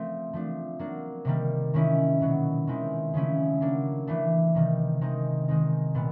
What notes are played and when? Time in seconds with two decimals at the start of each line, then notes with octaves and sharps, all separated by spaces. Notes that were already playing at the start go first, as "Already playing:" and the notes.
Already playing: F3 A3 C4
0.33 F3 A3 D4
0.79 F#3 A#3 D4
1.25 C3 D#3 G3 A#3
1.74 D#3 G#3 C#4 E4
2.21 B2 F#3 B3
2.67 D#3 G#3 C4 E4
3.14 C#3 F3 A3 C#4 E4
3.61 F#3 A#3 D4
4.07 E3 A3 D4
4.55 C3 D#3 G3
5.01 D#3 G#3 C4 D#4
5.48 D#3 G#3 C4 D#4
5.95 A#2 G3 B3